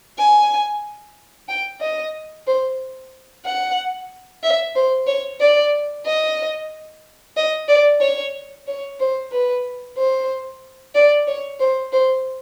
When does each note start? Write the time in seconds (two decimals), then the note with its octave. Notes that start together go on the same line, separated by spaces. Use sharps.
0.18 G#5
1.49 G5
1.81 D#5
2.47 C5
3.45 F#5
4.43 E5
4.75 C5
5.07 C#5
5.40 D5
6.06 D#5
7.37 D#5
7.68 D5
8.01 C#5
8.67 C#5
9.00 C5
9.32 B4
9.98 C5
10.95 D5
11.27 C#5
11.60 C5
11.93 C5